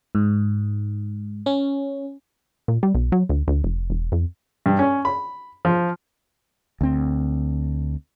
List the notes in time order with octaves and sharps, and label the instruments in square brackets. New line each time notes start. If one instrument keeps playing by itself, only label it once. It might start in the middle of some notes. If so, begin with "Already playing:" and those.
[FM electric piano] G#2
C#4
[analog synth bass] A#2
G3
B1
F#3
D2
D2
F1
E1
F2
[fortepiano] G2
C#4
B5
F3
[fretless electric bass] D2 C4